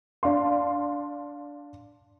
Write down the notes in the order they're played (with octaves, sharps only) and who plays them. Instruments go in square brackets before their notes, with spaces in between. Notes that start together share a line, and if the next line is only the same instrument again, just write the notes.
[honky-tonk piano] D4 F5 C6